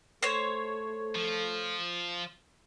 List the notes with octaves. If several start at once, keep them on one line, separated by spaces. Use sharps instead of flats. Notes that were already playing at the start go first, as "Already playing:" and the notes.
A3 A4 C5 C#5
F3